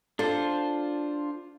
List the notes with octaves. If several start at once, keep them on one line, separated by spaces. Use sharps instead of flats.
D4 F4 A4 C5